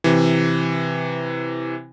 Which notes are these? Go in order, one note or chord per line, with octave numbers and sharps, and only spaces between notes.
C3 E3